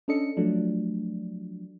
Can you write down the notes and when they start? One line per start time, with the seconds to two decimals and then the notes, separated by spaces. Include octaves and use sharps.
0.08 C#4 D4 A4 D#5 C#7
0.37 F3 F#3 A3 D4